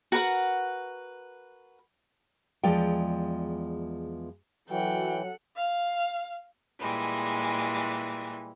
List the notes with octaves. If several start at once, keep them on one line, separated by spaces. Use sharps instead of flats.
F#4 A#4 B4 F#5
E2 F3 G#3 D5 G5
E3 F#3 A4 F#5 G5
F5
A#2 E3 G3 G#3